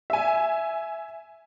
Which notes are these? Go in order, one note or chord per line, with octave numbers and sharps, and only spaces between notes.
E5 G#5